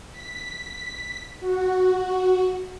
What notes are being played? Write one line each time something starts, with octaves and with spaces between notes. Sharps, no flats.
B6
F#4